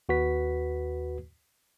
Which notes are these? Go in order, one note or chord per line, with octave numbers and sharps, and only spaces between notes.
D#2 F#4 B4 B6